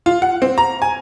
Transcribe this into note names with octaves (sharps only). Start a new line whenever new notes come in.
F4
F#5
C4
A#5
G#5